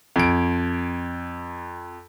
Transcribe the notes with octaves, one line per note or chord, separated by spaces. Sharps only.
F2 D7